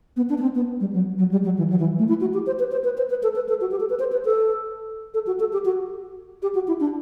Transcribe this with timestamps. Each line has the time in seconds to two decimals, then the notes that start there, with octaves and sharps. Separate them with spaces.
0.16 B3
0.29 D4
0.38 B3
0.42 C4
0.55 B3
0.80 G3
0.93 F#3
1.18 F#3
1.31 G3
1.44 F#3
1.57 E3
1.70 F#3
1.79 E3
1.99 A3
2.08 E4
2.21 F#4
2.33 G4
2.46 C5
2.59 B4
2.72 C5
2.84 B4
2.97 C5
3.10 B4
3.23 A4
3.35 B4
3.49 A4
3.61 F#4
3.71 G4
3.80 A4
3.90 B4
3.99 C5
4.12 B4
4.25 A4
5.14 A4
5.27 F#4
5.40 A4
5.53 G4
5.65 F#4
6.42 G4
6.54 F#4
6.67 E4
6.80 D4